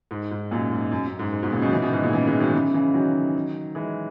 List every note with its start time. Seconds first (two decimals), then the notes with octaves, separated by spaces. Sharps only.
0.11 G#2
0.31 G#2
0.51 F#2 A#2
0.71 G#2
0.91 F#2
1.06 F#2
1.19 G#2
1.33 G#2
1.43 G#2 B2
1.52 A#2 C#3
1.62 B2 D#3
1.68 F#3
1.72 C#3 E3
1.82 B2 D#3
1.93 G#2 B2
2.03 A#2 C#3
2.13 C#3 E3
2.27 E3 G#3
2.40 D#3 F#3
2.54 C#3 E3
2.74 C#3 E3
2.94 D#3 F#3
3.75 E3 G#3